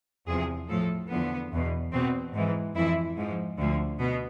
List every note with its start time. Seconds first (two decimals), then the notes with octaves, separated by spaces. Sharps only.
0.28 E2 C3 F3 G#4
0.69 A2 F3 A4
1.10 E2 D3 F3 B3
1.52 E2 B2
1.92 E2 B2 C4
2.34 G#2 E3
2.75 F2 E3 E4
3.17 G#2 F3
3.58 D2 D3 F3
3.99 B2 B3